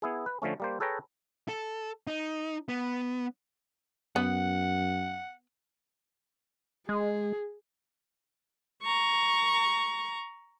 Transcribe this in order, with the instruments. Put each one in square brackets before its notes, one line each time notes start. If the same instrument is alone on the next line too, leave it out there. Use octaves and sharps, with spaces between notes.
[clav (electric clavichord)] B3 E4 G#4
B4
D3 F3 A3 C#4
G3 A#3 C5
G#4 A4 B4 C#5 G5 A#5
[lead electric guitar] A4
D#4
B3
[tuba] F#2 [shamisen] B3 [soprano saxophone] F#5
[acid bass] G#3 [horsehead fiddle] G#4
[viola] A#5 C#6